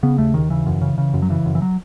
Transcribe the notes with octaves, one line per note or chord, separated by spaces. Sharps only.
C#3 B3
D#2 A3
D#2 D#3
C#3 E3
F#2
C#3
C#3
F#2
F#3
C#3 E3
F#2
E3
F#3